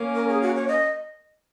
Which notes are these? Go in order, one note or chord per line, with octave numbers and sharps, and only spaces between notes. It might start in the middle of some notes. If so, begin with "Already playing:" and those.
Already playing: A#3 C#4
A#4
G#4
F#4
C#5
D#5